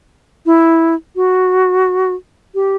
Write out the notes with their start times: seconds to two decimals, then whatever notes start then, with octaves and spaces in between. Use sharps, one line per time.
0.46 E4
1.16 F#4
2.55 G4